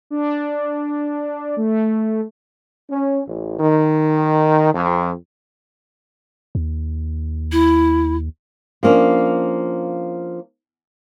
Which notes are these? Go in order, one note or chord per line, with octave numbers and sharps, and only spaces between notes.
D4
A3
C#4
A1
D#3
F2
D#2
E4
F3 A#3 C#4 D4